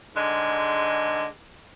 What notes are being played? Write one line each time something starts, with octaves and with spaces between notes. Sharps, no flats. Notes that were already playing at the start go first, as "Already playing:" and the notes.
G#2 D3 G#3